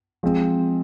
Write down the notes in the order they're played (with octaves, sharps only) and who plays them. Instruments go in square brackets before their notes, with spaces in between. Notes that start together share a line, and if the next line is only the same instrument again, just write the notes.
[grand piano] F3 G#3 C4